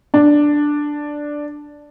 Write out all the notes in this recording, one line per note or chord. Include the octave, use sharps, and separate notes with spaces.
D4